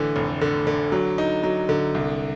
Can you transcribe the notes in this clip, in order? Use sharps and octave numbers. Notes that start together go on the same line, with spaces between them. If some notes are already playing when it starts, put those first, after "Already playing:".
Already playing: A2 D3 E3
F1
D3
D3
F#3
D#4
F#3
D3
C2